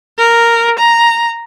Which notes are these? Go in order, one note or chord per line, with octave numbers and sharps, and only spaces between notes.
A#4
A#5